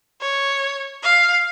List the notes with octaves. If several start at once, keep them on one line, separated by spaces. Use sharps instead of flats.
C#5
F5